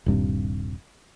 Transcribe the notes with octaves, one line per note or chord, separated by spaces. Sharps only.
D#1 G2 C3